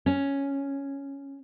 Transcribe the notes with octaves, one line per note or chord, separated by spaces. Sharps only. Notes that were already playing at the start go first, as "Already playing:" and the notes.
C#4